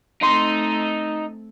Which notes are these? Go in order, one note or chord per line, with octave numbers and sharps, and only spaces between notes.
A3 C4 D#4 C6